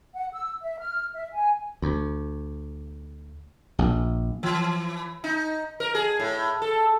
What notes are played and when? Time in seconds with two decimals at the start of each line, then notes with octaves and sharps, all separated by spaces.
0.16 F#5
0.33 E6
0.62 E5
0.80 F6
1.15 E5
1.34 G#5
1.82 D2
3.79 A#1
4.43 E3
5.24 D#4
5.80 A#4
5.95 G#4
6.20 A2
6.62 A4